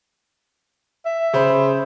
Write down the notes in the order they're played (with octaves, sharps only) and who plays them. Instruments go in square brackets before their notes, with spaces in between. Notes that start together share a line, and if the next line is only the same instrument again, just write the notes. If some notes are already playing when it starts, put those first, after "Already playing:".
[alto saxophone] E5
[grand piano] C#3 C5 B5